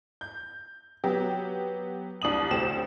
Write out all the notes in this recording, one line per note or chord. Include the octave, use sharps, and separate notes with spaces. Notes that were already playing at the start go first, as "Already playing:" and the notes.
G6
F#3 B3 G4
C2 D4 D#6 F#7
A1 D2 G4 C5 E7